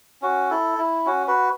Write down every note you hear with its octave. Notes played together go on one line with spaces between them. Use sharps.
C#4 F#4
E4 A4
E4
C#4 F#4
F#4 B4